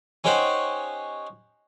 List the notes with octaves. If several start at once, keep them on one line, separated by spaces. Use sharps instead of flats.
C#4 D#4 G4 C5 F#5